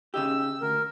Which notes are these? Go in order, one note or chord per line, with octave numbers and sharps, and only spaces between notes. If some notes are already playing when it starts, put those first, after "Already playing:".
C#3 D#4 G4 E6
D2 A#4